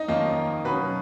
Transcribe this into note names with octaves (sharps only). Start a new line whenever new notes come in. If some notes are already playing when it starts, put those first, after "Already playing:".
Already playing: D#4 D#5
F2 D#3 A#3 C#4 F4
B2 F#3 C#4 B4